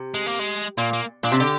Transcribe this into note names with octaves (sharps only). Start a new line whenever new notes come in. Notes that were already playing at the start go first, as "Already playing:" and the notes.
Already playing: C3
G#3
A#3
G#3
A#2 A#3
A#3
A#2 D4
C3
D3 G4